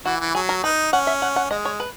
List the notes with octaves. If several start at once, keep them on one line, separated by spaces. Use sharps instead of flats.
E3 F#4
E3
F#3 G#4
A#4
D#4 B4
C#4 F#5
E5
F#5
F#5
G#3 D#5
C#5
B4